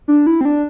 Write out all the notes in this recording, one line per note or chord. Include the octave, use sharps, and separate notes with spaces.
D4
E4
C4
D4